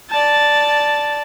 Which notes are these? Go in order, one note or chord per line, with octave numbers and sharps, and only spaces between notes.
D5 A5